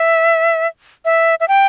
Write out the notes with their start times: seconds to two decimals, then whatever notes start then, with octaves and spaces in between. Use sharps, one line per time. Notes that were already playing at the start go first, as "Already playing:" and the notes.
Already playing: E5
1.05 E5
1.40 E5
1.48 G5